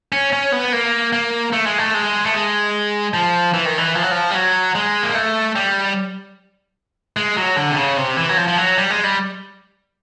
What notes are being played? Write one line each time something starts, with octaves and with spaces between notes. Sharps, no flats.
C#4
C#4
B3
A#3
A#3
A3
G#3
A3
G#3
A3
G#3
F3
E3
D#3
E3
F3
F#3
F3
G3
F#3
G#3
A#3
A3
G3
G#3
F#3
D3
C3
C#3
C3
E3
F#3
F3
F3
F#3
G3
G#3
G3